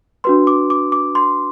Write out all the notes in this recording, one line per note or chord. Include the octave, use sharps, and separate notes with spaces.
D4 F#4 B4 C6
D6
D6
D6
C6